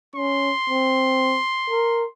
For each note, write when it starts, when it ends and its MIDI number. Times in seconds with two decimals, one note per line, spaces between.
0.16 0.51 61
0.16 2.11 84
0.70 1.38 60
1.70 2.04 70